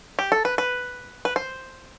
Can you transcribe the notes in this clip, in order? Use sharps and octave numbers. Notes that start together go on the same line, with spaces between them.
G4
A4
B4
B4
B4
C5